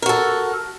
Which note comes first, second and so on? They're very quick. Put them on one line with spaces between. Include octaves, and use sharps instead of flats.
A#4 F#4 A4